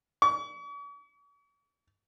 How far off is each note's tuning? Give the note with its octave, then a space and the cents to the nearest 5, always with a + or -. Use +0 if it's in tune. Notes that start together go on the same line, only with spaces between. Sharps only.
C#6 +45